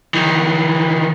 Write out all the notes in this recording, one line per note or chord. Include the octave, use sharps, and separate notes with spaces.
D#3 E3